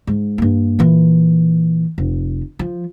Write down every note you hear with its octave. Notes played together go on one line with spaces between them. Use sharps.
G#2
G2 A#3
A#2 E3
F1
F3